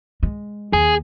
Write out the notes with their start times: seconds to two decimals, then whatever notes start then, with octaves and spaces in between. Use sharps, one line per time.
0.23 G#3
0.73 D#2 G#4